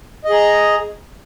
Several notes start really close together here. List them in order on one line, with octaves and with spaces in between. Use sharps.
D#5 G#4 A#5